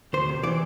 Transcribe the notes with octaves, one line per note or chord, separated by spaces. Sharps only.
D2 C5
C3
E3 D5